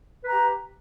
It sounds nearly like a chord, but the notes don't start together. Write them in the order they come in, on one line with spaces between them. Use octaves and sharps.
B4 A#5 G4